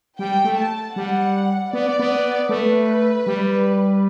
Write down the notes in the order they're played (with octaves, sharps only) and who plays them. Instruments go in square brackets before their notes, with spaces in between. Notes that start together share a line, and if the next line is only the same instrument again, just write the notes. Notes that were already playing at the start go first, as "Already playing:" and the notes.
[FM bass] G3 [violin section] G5
[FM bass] A3
[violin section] A5
[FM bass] G3 [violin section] F#5
[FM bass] B3 [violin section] D5
[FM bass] B3
[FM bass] A3 [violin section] B4
[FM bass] G3